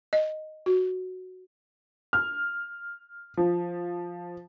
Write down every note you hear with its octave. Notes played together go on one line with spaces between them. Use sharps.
D#5
F#4
F6
F3